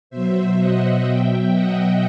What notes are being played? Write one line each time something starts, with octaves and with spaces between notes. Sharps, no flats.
B2 F#3 C5 E5
D#5 F#5
B2 F#3 E5 G5
D#5 F#5